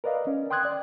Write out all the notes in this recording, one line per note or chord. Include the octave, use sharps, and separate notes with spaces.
A#4 B4 D5 D#5 F5
C#4
G5 C6 D#6 F#6 G#6
D5